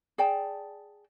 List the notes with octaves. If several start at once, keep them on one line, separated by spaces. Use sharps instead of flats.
G#4 D5 G5 A5